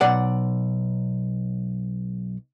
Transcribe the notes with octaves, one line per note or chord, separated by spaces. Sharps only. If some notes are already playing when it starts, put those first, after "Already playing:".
B1 D5 F#5